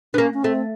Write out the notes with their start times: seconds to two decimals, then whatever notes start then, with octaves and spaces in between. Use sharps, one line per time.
0.14 B3 D4
0.18 A#3 C#4
0.34 C#4
0.43 A3 C4